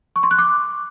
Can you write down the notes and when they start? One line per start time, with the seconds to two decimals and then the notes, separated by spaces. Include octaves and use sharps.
0.16 C#6
0.23 C6
0.31 F#6
0.38 D6